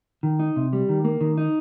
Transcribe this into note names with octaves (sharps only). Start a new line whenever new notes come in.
D#3
D#4
C3
G3
D#3
A#3
D#3
D#4